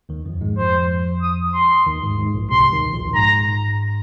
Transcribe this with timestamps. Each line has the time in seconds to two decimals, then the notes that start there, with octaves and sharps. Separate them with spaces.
0.09 D#2 D#3
0.25 F2 F3
0.41 G#2 G#3
0.58 F2 F3 C5
1.22 D#6
1.54 C6
1.87 D#2 D#3
2.03 G#2
2.19 G#2
2.34 A#1 A#2
2.50 C2 C3 C6
2.72 D#2 D#3
2.93 A#1 A#2
3.14 G#2 A#5